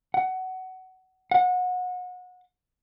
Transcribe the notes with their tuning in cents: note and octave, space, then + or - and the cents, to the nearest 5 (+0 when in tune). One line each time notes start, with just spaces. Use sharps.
F#5 +20
F#5 -30